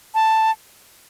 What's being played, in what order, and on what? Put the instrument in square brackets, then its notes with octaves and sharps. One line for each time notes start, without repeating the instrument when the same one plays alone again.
[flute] A5